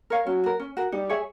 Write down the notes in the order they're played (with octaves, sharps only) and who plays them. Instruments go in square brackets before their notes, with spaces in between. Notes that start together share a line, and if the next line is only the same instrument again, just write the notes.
[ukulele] A#4 C#5 F5
[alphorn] F#3 [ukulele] C#4
[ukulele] F#4 A#4
C#4
F#4 A#4
[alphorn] G3 [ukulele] D#4
[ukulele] G#4 C#5 E5